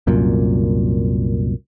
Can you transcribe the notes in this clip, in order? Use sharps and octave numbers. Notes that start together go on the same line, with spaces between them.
C2 F#2 A#2